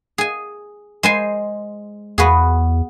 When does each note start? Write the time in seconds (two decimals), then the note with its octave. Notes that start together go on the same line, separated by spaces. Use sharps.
0.18 G#4 G#5
1.03 G#3 C5 G#5
2.18 E2 B3 F#4 G#4